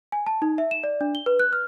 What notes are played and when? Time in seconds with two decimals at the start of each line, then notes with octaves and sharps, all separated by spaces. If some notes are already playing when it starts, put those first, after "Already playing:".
0.12 G#5
0.26 A5
0.42 D#4
0.58 E5
0.71 E7
0.84 D5
1.01 D4
1.15 G7
1.26 B4
1.39 F#6
1.53 F6